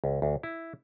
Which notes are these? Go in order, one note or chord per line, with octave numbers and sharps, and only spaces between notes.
C#2
D2
E4